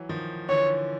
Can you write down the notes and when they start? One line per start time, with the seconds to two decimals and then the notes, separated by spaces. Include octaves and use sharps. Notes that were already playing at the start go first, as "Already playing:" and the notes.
Already playing: E3 F#3
0.09 D#3 F3
0.49 D3 E3 C#5